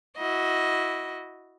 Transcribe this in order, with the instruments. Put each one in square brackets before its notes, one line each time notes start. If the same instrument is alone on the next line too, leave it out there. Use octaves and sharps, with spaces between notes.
[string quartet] E4 F#4 D#5